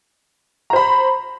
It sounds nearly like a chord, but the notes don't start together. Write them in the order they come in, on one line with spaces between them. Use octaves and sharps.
A#5 C5 B5